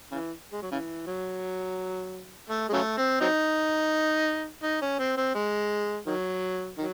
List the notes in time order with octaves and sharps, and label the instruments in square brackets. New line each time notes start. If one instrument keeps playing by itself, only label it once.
[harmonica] C#3 E3
G#3
F#3
C#3 E3
F#3
A3
G#3
C#3 F#3 A3
C4
F#3 C4 D#4
D#4
C#4
C4
C4
G#3
D#3 F#3
D#3 F#3